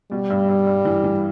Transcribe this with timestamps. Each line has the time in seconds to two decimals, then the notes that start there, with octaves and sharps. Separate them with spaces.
0.11 B2 G3
0.30 G2
0.49 G2
0.67 G2
0.85 E3
1.04 E3